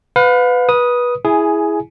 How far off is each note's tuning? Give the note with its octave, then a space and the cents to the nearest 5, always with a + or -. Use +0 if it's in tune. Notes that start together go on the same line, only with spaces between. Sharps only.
B4 +20 F5 +40
B4 -20 D#6 +0
E4 +0 G#4 +0 G#5 +15